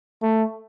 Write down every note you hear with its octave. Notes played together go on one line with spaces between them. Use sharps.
A3